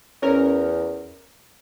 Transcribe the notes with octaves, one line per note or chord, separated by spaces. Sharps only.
E2 C#4 A#4